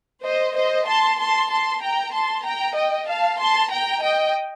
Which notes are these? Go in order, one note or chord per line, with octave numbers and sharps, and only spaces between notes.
C5 D#5
C5 D#5
A5 C6
A5 C6
A5 C6
G5 A#5
A5 C6
G5 A#5
D#5 G5
F5 A5
A5 C6
G5 A#5
D#5 G5